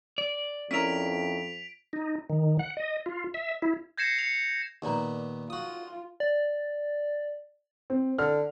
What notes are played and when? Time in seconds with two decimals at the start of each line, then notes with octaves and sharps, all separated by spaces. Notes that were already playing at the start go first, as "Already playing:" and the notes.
0.18 D5
0.71 F2 C#4 E4 A#4 B6 D7 F7
1.93 D#4
2.30 D#3
2.59 F#5
2.77 D#5
3.06 F4
3.34 E5
3.62 E4
3.97 G6 G#6 A#6 C7 C#7 E7
4.18 C#7 F7
4.82 D#2 A#2 B3 D#4 D5 A#5
5.50 F4 F#4 D#6
6.20 D5
7.90 C4
8.18 D3 F6